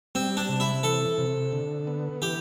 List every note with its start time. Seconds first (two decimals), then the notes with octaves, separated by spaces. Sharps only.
0.15 G3 C4
0.37 D4
0.49 C3
0.60 E4
0.83 E3 A4
1.18 C3
1.53 D3
1.87 B3
2.21 E3 G4